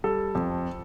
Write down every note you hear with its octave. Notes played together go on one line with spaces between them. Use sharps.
G3 A4
F2